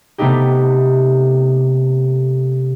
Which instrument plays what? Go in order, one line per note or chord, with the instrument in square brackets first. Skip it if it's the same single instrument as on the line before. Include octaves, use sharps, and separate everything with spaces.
[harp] C3 A3 B3 D#4 G4